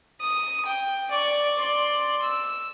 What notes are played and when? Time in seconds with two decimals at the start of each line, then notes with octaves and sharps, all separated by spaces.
0.21 D#6
0.66 G5
1.10 D5 C#6
1.59 D5 C6
2.23 E6